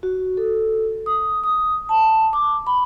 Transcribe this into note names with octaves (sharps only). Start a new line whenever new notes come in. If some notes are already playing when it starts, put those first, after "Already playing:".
F#4
A4
D#6
D#6
A5
D6
B5